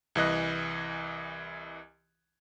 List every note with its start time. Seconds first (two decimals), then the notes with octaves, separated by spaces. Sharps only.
0.15 C2 E3 D#5 F#6